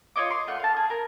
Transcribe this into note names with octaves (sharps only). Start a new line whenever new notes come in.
F4 C#5 D#5 D6
C6
A3 F4 F#5 F6
F5 A5
G#4
A#4